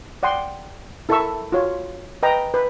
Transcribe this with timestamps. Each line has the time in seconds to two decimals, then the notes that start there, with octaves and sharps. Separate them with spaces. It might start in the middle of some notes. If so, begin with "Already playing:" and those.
0.23 D5 F#5 G5 C6
1.09 E4 A4 A#4 E5 C#6 E6
1.52 F4 F#4 C#5
2.23 B4 D#5 G5 A#5
2.54 B4